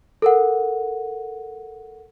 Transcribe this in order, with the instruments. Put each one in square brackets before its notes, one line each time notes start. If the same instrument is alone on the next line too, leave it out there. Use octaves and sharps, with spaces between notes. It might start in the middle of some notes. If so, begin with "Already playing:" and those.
[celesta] A4 A#4 F#5